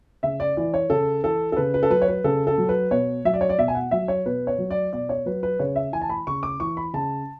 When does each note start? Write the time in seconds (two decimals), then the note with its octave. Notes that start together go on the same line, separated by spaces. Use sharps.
0.23 C#3 E5
0.40 D5
0.57 E3 D5
0.74 C#5
0.90 C#3 A4
1.24 E3 A4
1.52 A4
1.57 C#3 B4
1.74 B4
1.83 A4
1.90 F#3 B4
2.02 C#5
2.08 B4
2.24 C#3 A4
2.47 A4
2.58 F#3
2.69 B4
2.91 B2 C#5
3.25 F#3 E5
3.34 D5
3.41 C#5
3.49 D5
3.58 B2 E5
3.68 G#5
3.75 F#5
3.91 F#3 E5
4.08 C#5
4.26 B2 B4
4.47 C#5
4.59 F#3
4.71 D5
4.93 B2 D5
5.09 C#5
5.26 F#3 B4
5.43 B4
5.59 C#3 C#5
5.76 E5
5.92 E3 G#5
6.01 A5
6.10 B5
6.27 C#3 C#6
6.43 D6
6.60 E3 C#6
6.77 B5
6.93 C#3 A5